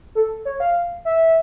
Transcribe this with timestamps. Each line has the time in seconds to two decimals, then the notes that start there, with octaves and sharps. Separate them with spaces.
0.15 A4
0.45 C#5
0.60 F5
1.05 E5